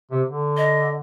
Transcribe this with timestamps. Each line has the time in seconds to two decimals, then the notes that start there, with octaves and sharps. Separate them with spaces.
0.11 C3
0.26 D3
0.57 D#5